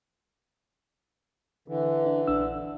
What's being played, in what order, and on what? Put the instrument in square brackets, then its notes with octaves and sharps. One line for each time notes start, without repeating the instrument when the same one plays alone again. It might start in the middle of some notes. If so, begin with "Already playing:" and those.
[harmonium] D3 E3
[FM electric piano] D4
A#1 D4 E6